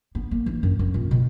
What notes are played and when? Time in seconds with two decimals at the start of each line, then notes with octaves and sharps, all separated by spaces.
0.15 B3
0.31 A#3
0.46 E3
0.63 F#2
0.79 F#2
0.94 A#2
1.11 B2